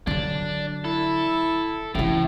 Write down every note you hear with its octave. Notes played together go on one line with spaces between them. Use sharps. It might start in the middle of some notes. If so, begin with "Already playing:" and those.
D3 F#3 D4
E4 A4
A2 C#3 E3